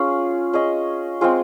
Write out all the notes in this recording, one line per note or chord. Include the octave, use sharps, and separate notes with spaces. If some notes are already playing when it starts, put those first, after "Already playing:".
Already playing: C#4 F4 G#4
C#4 G#4 D#5
G#3 C4 F4 G#4